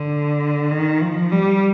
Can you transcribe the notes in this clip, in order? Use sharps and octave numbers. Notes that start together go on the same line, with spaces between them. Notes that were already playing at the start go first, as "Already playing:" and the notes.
Already playing: D3
D#3
F3
G3